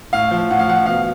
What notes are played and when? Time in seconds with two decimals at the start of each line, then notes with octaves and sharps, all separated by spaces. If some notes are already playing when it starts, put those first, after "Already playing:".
0.13 A2 F5
0.31 F3
0.50 A2 F#5
0.59 F5
0.68 F3 F#5
0.86 B2 F5